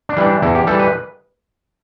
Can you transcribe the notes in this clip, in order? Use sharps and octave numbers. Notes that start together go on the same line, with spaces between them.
D4
E3 G3
D4
E2 E4
G4
E3 G3 A4
B4